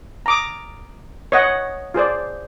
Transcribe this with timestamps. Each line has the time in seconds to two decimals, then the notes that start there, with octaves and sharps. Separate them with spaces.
0.26 A#5 D6 D#6
1.32 C#5 D#5 F#5
1.94 F4 G#4 C5 D5